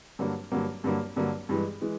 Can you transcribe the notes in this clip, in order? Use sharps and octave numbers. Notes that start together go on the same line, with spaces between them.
G2 D3 F#3 A#3
G2 D3 F#3 A#3
G2 D3 F#3 A#3
G2 D3 F#3 A#3
G2 E3 G#3
E3 G#3